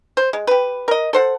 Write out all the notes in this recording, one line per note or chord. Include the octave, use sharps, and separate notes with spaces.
C5
G#3
G4 B4
A#4 D#5
A4 C5 F#5